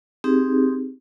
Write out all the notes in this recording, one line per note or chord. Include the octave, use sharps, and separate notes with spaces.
C4 D#4 G4 G#4